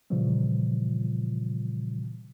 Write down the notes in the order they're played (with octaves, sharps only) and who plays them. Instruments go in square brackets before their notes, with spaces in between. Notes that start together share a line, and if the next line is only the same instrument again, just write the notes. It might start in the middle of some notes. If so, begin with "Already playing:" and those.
[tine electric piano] A#2 C#3 E3 F3 G3